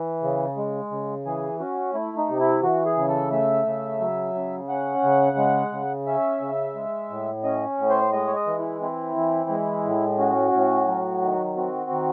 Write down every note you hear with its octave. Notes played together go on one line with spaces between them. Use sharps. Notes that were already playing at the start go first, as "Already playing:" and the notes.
Already playing: E3
C#3
G#3
C#3
E3 G#4
C#4 F#4
A3 E4
D#4
C3
E4
E3 F#4
G#4
C#3
A4
A3 E5
C#3
F#3
C#3
C#4 F#5
C#3
G#3
C#3
C#4 E5
C#3
G#3
A2
C#4 D#5
A2
C5
G#3 D#5
C#5
D#5
E3
E4
C4 E4
E3
G#3
A2
C#4 F#4
A2
F#3
D#3
C4 F#4
D#3